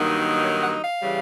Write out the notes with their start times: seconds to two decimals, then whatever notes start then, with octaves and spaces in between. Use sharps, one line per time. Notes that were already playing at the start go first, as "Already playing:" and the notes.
Already playing: G2 D#3 F#3 A#3 D#4
0.42 C#5
0.62 F#5
0.82 F5
1.02 C#3 E3 G3